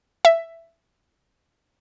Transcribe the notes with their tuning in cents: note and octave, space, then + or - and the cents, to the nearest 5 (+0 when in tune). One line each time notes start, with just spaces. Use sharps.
E5 +10